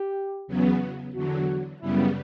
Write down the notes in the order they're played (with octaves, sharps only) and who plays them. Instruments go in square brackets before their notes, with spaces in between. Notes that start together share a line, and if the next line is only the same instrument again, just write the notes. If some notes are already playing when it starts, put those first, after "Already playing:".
Already playing: [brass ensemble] G4
[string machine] E2 C#3 F#3 B3
[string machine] E2 D3 F#3 [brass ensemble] F#4
[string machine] F#2 C#3 G3 B3 [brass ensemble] E4